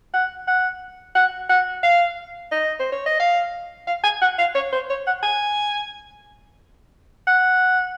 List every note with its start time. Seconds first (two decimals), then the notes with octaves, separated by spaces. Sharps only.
0.14 F#5
0.47 F#5
1.15 F#5
1.49 F#5
1.83 F5
2.52 D#5
2.79 C5
2.92 C#5
3.06 D#5
3.20 F5
3.87 F5
4.04 G#5
4.22 F#5
4.38 F5
4.55 C#5
4.72 C5
4.90 C#5
5.07 F#5
5.23 G#5
7.27 F#5